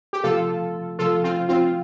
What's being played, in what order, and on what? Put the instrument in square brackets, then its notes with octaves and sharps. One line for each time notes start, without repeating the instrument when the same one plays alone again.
[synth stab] G4
[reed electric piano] C3 F3 A3 [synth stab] F4 A4
[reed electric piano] C3 F3 A3 [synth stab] F4 A4
[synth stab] C4 F4
C4 F4